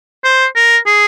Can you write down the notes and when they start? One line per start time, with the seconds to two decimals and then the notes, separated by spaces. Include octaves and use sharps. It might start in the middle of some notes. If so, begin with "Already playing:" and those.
0.24 C5
0.55 A#4
0.86 G#4